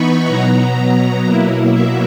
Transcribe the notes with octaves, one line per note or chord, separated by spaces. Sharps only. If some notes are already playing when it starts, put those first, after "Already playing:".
Already playing: E3 B3 D#4 B5 C#6
B2 F#3 B3 A#5
B2 F#3 A#3 E4
E5